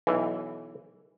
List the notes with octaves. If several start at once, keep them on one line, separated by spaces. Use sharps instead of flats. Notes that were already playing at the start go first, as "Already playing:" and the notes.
B1 E3